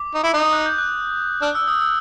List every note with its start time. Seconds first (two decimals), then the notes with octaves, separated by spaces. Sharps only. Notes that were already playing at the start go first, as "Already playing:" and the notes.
Already playing: D6
0.14 D#4
0.24 E4
0.34 D#4
0.40 D#6
0.53 F#6
0.66 G6
0.78 F#6
1.42 D4 F6
1.55 E6
1.68 D#6
1.81 E6